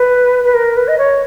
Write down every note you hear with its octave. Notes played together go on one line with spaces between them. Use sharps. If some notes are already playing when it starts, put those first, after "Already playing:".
Already playing: B4
B4
A#4
B4
D#5
C#5